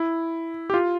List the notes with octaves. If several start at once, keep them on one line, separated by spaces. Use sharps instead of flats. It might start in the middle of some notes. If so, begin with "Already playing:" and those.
Already playing: E4
G4
F4